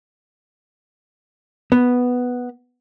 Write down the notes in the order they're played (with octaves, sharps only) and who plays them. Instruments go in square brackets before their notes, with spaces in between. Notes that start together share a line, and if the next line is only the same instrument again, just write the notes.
[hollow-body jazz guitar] B3